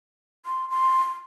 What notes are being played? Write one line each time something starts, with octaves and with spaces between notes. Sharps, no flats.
C6
C6